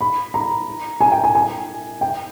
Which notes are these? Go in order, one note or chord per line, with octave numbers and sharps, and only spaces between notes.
B5
A#5
G#5
G5
G#5
G#5
G5